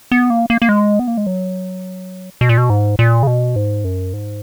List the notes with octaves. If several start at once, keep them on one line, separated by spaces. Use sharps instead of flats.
B3
A#3
A#3
A#3
G#3
B3
A#3
G#3
F#3
B2
A#2
B2
G#2
A#2
C#3
B2
G#2
F#2
G#2